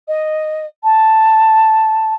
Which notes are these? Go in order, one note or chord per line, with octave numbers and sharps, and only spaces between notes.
D#5
A5